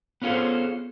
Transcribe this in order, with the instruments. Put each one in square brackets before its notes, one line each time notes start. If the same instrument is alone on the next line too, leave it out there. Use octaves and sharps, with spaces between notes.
[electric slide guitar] B3 C#4 F4 G#4 A4 C5